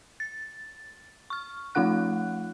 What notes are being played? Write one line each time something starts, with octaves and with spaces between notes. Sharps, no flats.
A6
C#6 F6
F3 A3 D#4 F4 F#5 F#6